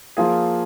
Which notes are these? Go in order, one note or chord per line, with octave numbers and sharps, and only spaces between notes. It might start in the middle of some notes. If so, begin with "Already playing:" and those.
F3 A#3 F4 G#4